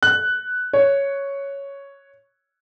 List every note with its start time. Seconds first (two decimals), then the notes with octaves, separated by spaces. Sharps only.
0.03 F#6
0.73 C#5